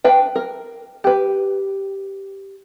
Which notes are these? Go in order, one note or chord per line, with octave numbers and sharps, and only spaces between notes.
D4 B4 F5 G5
A#4
G4 B4